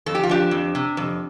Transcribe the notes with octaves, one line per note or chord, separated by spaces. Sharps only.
F2 A4
G4
F4
F3 D4 G4
F2
C3
F2